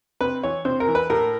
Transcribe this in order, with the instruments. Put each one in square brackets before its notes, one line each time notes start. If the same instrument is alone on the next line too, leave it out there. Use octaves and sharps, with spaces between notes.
[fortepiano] C3 B4
E3 C#5
C3 C5
A#4
E3
B4
A2 A#4